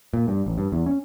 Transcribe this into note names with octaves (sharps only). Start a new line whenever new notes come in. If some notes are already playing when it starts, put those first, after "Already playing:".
A#2
G2
A1
G2
E2
C#4